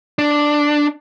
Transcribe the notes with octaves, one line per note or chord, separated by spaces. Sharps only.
D4